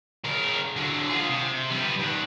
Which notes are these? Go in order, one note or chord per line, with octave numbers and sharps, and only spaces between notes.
C#3 A#4
D3 F#3
F4 G#4
C3
G3 B3
D#3 F#5